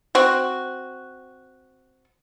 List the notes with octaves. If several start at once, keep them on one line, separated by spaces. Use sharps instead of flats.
C4 F#4